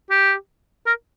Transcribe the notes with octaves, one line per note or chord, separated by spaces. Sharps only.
G4
A#4